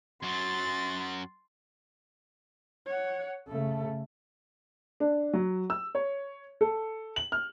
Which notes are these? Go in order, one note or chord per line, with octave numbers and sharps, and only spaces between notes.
F#2 F#3 C6 A6
C#5 F#5
C#3 A3 A4
D4
F#3
E6
C#5
A4
F#7
F6